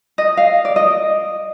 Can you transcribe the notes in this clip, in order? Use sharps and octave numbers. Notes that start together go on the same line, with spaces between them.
D#5
F5
D5
D#5